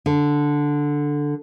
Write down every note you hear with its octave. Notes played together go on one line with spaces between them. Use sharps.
D3